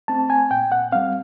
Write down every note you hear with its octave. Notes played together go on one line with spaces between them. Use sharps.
A3 C4 A5
G#5
A#2 G5
F#5
G3 C4 F5